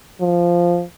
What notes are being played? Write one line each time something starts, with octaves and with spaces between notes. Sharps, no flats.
F3